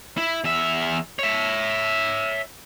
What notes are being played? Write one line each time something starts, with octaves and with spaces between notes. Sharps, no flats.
E4
E2 E5
C#5 E5